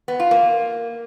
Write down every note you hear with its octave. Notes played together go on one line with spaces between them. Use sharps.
B3
F4
A#3